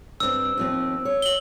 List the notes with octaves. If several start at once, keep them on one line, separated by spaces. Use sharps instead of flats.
G2 C4 E6
D#2 F3 C4
C#5
F#7 G7